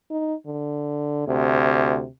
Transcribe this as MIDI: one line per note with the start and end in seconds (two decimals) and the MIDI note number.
0.10 0.34 63
0.47 1.27 50
1.28 2.02 38
1.28 2.09 48